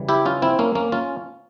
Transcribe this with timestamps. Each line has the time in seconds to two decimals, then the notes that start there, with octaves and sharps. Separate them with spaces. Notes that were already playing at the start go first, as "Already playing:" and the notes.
Already playing: C#3 E3 G3
0.09 E4 G4
0.25 C#4 F4
0.42 C4 E4
0.59 A#3 C#4
0.75 A#3 C#4
0.92 C#4 F4